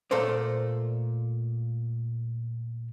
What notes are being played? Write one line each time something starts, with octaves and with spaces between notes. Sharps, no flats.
A#2 A3 A4 A#4 C5 D5